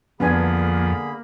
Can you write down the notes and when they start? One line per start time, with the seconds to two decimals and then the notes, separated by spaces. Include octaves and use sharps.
0.20 F2 D3 A#3 B3 D4 G#4 G#5 B5